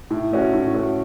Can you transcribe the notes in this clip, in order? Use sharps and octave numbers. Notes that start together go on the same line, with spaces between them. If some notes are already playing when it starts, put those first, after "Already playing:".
A2
A3 C#4 F#4
A2
A3 C#4 F#4